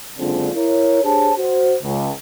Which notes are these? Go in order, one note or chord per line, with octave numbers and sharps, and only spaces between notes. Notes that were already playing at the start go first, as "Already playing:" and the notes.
F#1 D3 G#3 C4 D4 F4
E4 A#4 C#5
D4 G4 G#4 C5 C#5 A5
F#4 C5
C#2